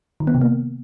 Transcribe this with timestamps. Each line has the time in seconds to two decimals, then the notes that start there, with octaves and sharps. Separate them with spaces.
0.20 D#3
0.27 B3
0.34 C3
0.41 A#3